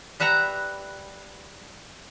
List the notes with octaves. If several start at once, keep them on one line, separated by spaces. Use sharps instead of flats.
G3 B4 E5 F#5 A#5